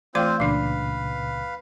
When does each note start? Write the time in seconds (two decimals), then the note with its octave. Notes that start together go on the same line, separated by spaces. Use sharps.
0.15 E3 A3 C4 F4 C5 C6
0.40 C#2 A#2 C#3 E3 D4 B4 F5